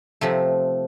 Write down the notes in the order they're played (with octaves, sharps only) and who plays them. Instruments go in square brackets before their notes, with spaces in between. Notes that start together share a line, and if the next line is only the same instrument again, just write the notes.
[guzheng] C3 F3 A3